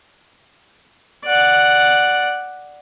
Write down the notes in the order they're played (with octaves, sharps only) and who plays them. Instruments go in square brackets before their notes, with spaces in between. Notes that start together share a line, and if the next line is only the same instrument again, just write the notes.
[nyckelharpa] D5 F#5